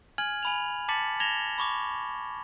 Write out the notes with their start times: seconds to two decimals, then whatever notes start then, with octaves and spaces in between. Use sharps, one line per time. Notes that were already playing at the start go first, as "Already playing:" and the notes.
0.18 G#5 F6 G#6 F#7
0.43 G#5 B5 F7
0.88 A5 D6 A6 B6 C#7 F#7
1.20 G#6 A#6 E7 F7 G7
1.58 B5 C#6 D6